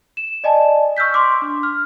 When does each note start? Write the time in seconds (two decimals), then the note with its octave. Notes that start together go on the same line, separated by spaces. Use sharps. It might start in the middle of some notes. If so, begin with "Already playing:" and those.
0.17 E7
0.44 D5 D#5 G#5 A5
0.97 C#6 E6 F6 G6 B6
1.14 C6 D6
1.42 D4
1.63 F6